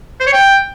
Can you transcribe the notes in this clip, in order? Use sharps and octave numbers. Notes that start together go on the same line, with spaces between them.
C5
C#5
G5